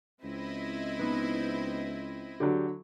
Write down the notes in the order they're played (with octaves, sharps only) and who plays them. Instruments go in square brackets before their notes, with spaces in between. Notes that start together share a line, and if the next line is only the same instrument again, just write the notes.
[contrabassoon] C#2 [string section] C4 E4 D#5
[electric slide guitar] B3 D#4 B4
[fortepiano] D3 F#3 [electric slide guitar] G4 D5